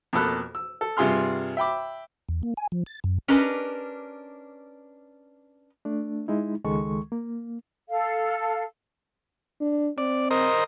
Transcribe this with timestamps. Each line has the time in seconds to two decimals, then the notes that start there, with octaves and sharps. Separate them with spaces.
0.13 F2 B2 A#3 A4 B5 F#6
0.55 E6
0.81 A4
0.97 G2 C3 F4 G#4 C6 F6
1.57 E5 G5 B5 D6
2.29 E2
2.43 A#3
2.57 G#5
2.72 F3
2.86 A6
3.04 F#2
3.28 C#4 D4 G4 A#4 B4 D#5
5.85 A3 D4
6.28 G#3 D#4 E4
6.64 C#2 D#3 G#3 A4 C#6
7.12 A#3
7.89 A4 F5
9.61 D4
9.98 C4 D5
10.31 A#4 C5 D#5